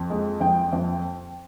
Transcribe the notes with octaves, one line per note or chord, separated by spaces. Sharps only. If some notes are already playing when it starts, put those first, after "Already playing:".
Already playing: F2
G#3
F2 G5
F2